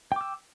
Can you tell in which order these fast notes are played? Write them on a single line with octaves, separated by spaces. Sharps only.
G5 D6 E6